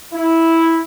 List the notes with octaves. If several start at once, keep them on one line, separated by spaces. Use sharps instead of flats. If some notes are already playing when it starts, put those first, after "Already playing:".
E4